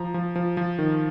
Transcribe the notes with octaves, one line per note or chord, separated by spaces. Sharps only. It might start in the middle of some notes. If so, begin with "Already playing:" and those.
Already playing: F3 A#5
F3
F3
F3
D#3